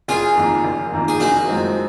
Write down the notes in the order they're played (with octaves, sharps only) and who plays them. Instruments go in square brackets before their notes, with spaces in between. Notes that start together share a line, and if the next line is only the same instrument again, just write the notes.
[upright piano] F#1 [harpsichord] F4 G#4
[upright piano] F2 D#3 A#3
F#1
F2 D#3 A#3
[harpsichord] G#4
[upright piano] F#1 [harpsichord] D#4 F#4
[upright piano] F#2 F3 G#3 C4